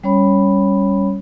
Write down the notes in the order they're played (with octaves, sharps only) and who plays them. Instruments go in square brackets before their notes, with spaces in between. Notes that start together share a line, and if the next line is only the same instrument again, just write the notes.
[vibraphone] G3 C#4 C#5 B5